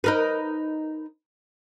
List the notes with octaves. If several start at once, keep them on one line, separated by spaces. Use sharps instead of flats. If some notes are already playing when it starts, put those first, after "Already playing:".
D#4 A#4 B4